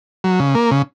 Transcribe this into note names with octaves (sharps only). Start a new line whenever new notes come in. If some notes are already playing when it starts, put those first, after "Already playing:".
F#3
C#3
A#3
C#3